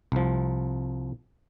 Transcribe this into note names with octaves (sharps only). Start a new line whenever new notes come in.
C2 F3